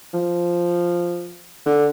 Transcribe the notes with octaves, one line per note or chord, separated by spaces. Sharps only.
F3
D3